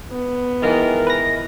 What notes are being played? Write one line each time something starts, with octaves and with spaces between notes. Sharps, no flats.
B3
G#2 D#3 E3 F4 A#4
B4 A#6